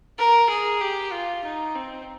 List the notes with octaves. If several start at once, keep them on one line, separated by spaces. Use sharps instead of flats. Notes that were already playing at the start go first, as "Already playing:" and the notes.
A#4
G#4
G4
F4
D#4
C4